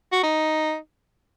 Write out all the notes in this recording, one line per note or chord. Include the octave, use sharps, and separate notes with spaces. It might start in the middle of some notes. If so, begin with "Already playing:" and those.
F#4
D#4